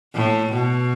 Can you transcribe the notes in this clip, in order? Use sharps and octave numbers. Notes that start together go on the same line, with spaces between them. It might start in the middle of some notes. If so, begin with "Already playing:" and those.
A2
B2